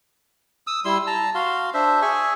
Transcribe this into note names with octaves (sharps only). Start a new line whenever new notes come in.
D#6 E6
G3 E4 C6 E6
A5 A#5
F#4 F5 C6
D4 C5 E5
G#4 E5 G#5 C#6